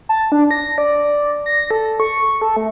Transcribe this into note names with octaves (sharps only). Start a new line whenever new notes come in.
A5
D4
A#6
D5
A#6
A4
C#6
A4
A3